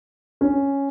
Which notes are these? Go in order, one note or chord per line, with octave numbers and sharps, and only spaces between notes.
C#4